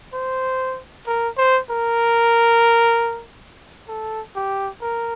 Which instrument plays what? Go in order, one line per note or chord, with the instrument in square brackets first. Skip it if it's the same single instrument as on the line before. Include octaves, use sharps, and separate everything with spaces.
[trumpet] C5
A#4
C5
A#4
A4
G4
A#4